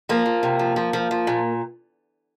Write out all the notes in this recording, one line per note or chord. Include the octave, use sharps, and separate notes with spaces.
F3 A#3
F3
C3
F3
F3
F3
F3
A#2